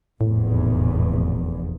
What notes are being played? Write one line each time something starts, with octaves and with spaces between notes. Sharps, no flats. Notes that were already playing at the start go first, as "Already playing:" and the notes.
F1 A#1 E2 A2